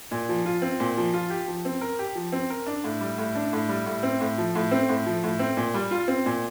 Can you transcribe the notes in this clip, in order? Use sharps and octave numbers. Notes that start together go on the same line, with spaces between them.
A#2
F3
F4
C4
A#2
F3
F4
G4
F3
C4
A#4
G4
F3
C4
A#4
D4
A2
G3
A2
D4
A2
G3
A2
C4
A2
F3
A2
C4
A2
F3
A2
C4
A#2
G3
F4
C4
A#2